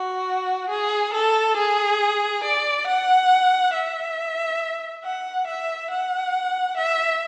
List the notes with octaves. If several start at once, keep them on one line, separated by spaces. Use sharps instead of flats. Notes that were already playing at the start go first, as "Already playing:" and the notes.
Already playing: F#4
G#4
A4
G#4
D5
F#5
E5
F#5
E5
F#5
E5